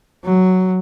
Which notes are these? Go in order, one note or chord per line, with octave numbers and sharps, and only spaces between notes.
F#3